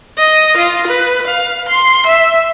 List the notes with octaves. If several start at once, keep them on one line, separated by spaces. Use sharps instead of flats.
D#5
F4
B4
F5
C6
E5